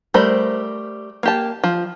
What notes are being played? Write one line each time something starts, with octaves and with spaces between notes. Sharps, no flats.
G3 A3 A#4 C5 B5
A#3 G4 A5
F3